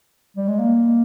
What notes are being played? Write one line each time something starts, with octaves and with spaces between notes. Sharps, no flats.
G3
G#3
A#3